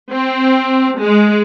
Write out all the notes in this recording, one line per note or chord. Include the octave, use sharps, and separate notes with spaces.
C4
G#3